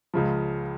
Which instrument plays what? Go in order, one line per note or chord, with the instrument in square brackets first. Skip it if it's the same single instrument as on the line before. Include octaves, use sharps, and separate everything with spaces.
[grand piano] C#2 C#3 F3